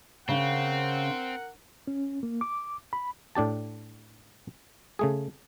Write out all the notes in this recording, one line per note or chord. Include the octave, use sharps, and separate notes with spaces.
C#3 C4 A#4 F#5
C#4
A#3
D6
B5
A2 D4 G4 A5
C#3 A3 G#4